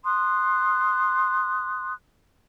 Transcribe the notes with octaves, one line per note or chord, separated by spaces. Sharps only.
C6 D#6 F#6